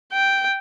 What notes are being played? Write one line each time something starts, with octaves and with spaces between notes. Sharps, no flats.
G5